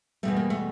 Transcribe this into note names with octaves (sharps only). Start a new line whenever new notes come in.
E2 B2 G3 A3
A#3
A3